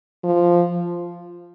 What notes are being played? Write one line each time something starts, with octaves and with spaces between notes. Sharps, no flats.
F3